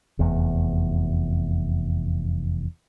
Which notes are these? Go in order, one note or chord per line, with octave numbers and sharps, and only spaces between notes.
F1 E2